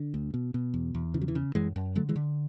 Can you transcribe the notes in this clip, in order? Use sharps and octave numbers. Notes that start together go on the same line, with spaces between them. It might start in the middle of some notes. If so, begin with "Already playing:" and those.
Already playing: D3
D2
B2
B2
E2
E2
C#3 E3
F#3
E3
C#3
F#2 E3 G#3
F#2
D3 F#3 A3
E3 G#3
D3